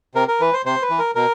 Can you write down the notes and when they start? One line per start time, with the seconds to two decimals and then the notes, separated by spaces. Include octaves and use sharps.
0.15 C3 A#4
0.28 A#4
0.40 E3 B4
0.53 C5
0.65 C3 C5
0.82 B4
0.90 E3
0.99 A#4
1.15 B2 A#4